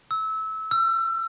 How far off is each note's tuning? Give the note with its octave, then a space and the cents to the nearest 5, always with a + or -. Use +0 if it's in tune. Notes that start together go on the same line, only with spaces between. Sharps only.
E6 -25
E6 +35